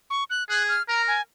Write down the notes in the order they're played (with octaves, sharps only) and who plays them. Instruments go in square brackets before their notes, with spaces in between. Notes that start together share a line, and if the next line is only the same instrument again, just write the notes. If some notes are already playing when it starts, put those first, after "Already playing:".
[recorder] C#6
F#6
[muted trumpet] G#4 [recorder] F#6
[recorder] F6
[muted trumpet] A#4 [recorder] A#5
[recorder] G#5